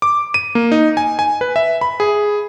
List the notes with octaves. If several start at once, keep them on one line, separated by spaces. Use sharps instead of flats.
D6
D#7
A#3
D#4
G#5
G#5
B4
E5
B5
G#4